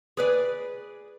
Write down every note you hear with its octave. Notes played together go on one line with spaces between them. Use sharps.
G#4 B4 D5